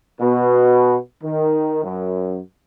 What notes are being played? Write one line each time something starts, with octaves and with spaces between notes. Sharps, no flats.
B2
D#3
F#2